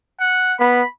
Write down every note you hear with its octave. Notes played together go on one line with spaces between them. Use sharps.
F#5
B3 B5